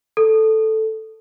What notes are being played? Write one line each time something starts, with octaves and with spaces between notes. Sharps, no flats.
A4